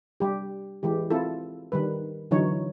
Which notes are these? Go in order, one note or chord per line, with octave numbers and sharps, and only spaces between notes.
G3 G4
E3 G#3 G4
C4 E4 F4 A4
D#3 G3 B4
D3 E3 F#3 D#4 C#5